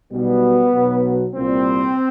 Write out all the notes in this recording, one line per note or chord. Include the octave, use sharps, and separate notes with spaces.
B1 B2 G3 B3
B1 B2 F#3
C2 A#2 G3 C4